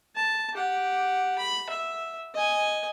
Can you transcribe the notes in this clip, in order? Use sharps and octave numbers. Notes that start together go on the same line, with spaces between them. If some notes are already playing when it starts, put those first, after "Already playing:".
A5
G4 F#5
B5
E5
D#5 G#5